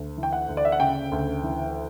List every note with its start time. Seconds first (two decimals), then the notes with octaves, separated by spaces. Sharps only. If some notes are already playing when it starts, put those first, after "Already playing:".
Already playing: D2
0.18 E3
0.23 G5
0.33 F#5
0.49 D2
0.57 D5
0.65 E5
0.72 F#5
0.80 C#3 G5
1.12 D2
1.43 E3